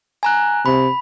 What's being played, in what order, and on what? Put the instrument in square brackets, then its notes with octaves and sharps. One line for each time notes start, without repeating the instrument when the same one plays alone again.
[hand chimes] G#5 A#5 F#6
[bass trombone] C3 [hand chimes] B5